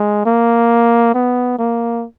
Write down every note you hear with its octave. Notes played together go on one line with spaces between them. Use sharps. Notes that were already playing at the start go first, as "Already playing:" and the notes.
Already playing: G#3
A#3
B3
A#3